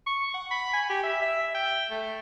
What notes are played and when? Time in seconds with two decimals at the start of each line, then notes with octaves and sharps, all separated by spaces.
0.07 C#6
0.34 F#5
0.51 B5
0.73 G#5
0.90 G4
1.03 E5
1.22 E5
1.55 G5
1.90 A3